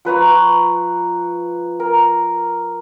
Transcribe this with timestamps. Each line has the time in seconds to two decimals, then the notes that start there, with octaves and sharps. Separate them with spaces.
0.05 F3 B4 A#5 C#6
1.80 A#4